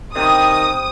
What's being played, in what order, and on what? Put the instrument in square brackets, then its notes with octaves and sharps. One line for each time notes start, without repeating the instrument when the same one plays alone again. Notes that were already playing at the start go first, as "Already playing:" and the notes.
[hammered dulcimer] C3 G4 B5 [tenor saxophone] D#3 [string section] D#6